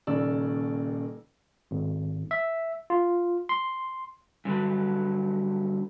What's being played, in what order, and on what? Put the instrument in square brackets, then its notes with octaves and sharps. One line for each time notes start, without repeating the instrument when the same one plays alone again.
[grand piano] D#1 D#2 C#3 D5 E6
[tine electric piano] G#1
E5
F4
C6
[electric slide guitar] G2 D3 F#3 B4